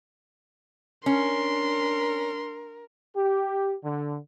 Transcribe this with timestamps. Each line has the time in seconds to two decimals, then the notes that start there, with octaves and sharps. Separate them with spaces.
1.06 C#4 D4 A#4 C6
3.15 G4
3.83 D3